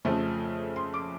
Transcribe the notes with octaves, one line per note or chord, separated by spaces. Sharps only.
F2 C#3 F3 A3
C6
D6